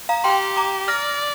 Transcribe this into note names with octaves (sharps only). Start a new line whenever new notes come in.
F5 A#5
G4 G5 C6
A#5 D6
D5 F6 A#6